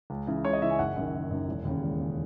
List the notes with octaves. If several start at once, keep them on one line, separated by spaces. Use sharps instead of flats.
C#2
C#3 E3
C#2 C#5
D#5
C#3 E3 E5
G#5
F#1 F#5
F#2 D#3
F#1
F#2 D#3
E1
D#2 C#3
E1
C#3